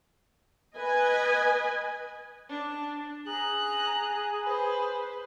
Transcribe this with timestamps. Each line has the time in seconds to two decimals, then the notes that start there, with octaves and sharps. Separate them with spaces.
0.76 B4 D#5 G#5
2.50 D4
3.27 G#4 A#5 F#6
4.43 B4 C5